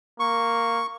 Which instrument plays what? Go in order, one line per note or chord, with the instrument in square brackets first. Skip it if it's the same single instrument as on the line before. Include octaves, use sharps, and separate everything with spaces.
[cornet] A#3 [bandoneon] C#6